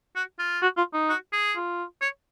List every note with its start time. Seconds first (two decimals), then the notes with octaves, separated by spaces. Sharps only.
0.16 F#4
0.39 F4
0.63 F#4
0.77 F4
0.94 D#4
1.09 F#4
1.33 G#4
1.56 F4
2.02 C#5